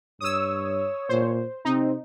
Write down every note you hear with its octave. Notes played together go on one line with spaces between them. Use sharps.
G2 C#5 D#6 E6
A#2 C5
C3 C4 D#4